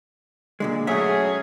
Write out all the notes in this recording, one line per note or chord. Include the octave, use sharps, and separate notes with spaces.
A#2 D3 G#3
F#3 A3 C#4 G#4 E5